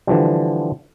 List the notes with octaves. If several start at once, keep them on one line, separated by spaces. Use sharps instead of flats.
D3 E3 F3 G3